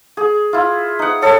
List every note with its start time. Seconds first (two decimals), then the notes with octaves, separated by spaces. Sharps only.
0.17 G#4
0.53 E4 F4
0.99 D#4 F#5
1.22 A4 C#5